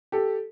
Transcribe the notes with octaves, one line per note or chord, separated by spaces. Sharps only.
G4 A4